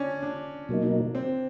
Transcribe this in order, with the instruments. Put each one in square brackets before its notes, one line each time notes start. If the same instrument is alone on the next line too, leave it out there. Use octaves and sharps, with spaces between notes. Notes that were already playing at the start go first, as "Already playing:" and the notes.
Already playing: [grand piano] C#4 D4
D4
[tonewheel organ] B2 F#3 A#3 D#4
[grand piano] C4